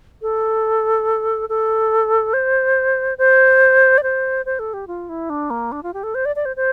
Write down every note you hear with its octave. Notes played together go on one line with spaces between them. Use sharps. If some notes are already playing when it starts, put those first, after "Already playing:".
A4
A4
C5
C5
D5
C5
C5
A4
G4
F4
E4
D4
A#3
D4
F4
G4
A4
C5
D5
D5
C5
C5